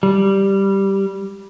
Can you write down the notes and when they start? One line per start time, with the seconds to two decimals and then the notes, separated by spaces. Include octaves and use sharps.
0.03 G3